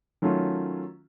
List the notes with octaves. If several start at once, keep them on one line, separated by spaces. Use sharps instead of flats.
D#3 F#3 A3 C#4 F4